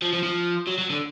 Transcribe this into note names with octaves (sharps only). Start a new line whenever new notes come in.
F3
F3
F3
F#3
F#3
D3